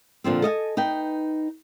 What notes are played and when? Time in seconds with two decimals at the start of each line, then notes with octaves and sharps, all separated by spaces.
0.24 A#2 D3 F3 C4
0.42 A4 D#5 F5 G#5
0.77 D#4 B4 G5